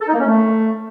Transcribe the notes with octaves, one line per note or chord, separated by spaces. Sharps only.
A4
D#4
A#3
C#4
A3